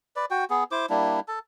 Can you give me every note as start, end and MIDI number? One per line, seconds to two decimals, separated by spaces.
0.16 0.26 71
0.16 0.26 74
0.31 0.45 66
0.31 0.45 79
0.50 0.64 59
0.50 0.64 68
0.72 0.86 64
0.72 0.86 72
0.72 0.86 86
0.90 1.20 55
0.90 1.20 58
0.90 1.20 62
0.90 1.20 64
1.28 1.39 69
1.28 1.39 81